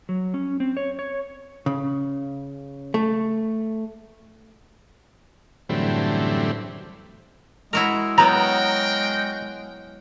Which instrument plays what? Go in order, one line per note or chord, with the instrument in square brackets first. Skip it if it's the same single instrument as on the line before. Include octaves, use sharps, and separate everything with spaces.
[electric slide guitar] F#3
C#4
C4
C#5
C#5
[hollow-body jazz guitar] C#3
A3
[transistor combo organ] F#2 A2 D3 E3 G3 C4
[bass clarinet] G#3 [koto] E4 F#4 A#4
[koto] F#3 B3 [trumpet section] F#4 A#4 G5 [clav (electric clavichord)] A#5